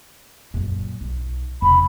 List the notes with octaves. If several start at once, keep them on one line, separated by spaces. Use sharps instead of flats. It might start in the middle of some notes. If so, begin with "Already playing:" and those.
F#2 A#2
B1
E1 C3 B5